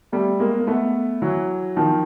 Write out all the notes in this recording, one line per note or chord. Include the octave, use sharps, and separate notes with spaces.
G3 A3
G#3 A#3
A#3
A3 B3
E3 F#3
D#3 F3